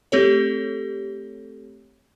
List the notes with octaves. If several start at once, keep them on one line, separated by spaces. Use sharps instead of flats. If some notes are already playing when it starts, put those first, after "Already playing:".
A3 C4 G4 A4 C#5